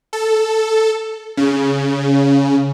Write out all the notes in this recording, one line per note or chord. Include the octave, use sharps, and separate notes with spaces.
A4
C#3